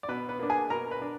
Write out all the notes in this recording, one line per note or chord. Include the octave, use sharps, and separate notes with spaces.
D5
B2 B3 B4
B3 B4
A#3 D4
G#4 G#5
B2 A#4 A#5
B4 B5
D4